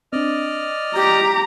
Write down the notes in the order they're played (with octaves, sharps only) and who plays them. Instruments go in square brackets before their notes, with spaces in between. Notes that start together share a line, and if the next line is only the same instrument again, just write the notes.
[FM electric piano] C4 D4 [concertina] D5 D#5 F6
[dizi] G4 [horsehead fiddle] A#5 [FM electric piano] G6